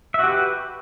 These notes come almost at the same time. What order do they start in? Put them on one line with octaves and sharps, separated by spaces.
E5 F#4 G4 B4